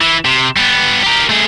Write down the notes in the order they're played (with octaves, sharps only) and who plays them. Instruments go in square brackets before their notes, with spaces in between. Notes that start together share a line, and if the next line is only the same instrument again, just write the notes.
[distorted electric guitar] E3
C3
G3 B3
G4 A#4
A3 G#4